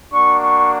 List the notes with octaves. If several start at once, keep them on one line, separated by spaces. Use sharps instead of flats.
A#3 D4 F#4 C#6
C#6